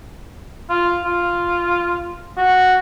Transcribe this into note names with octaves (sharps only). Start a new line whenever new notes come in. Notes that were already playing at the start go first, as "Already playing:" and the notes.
F4
F4
F#4